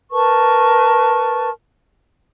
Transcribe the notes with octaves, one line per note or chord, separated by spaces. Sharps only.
A#4 B4 A5 C#6